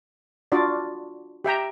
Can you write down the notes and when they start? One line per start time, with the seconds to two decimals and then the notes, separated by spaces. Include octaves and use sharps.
0.52 D4 F4 F#4 D5
1.44 G4 E5 G5 A#5